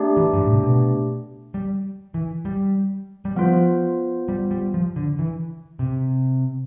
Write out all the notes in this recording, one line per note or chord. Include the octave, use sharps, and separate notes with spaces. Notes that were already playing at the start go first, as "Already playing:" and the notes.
Already playing: A3 D4 G4 D5
E3
G2
A2
C3
B2
G3
E3
G3
G3
F3 B3 F4 C5
G3
G3
F3
D3
E3
C3